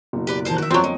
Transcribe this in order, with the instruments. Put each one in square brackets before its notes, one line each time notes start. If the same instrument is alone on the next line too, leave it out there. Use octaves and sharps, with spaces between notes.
[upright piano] F#1 B2
[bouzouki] G4 B4 D5
[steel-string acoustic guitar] A#2 E3 [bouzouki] C5 A5 A#5
[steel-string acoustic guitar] D#3 [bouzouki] F#4 E5
[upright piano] G1 F2 [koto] F#3 C4 [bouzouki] D4 [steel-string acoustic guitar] F4 F#4 G5
[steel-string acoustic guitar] A#3 [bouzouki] D#4